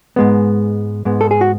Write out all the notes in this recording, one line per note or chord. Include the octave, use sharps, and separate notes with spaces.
G#2 G#3 B3
G#2 G#3 B3
A4
G#4
F#4